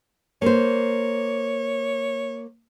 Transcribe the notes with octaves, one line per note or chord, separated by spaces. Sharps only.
A#3 C5 C#5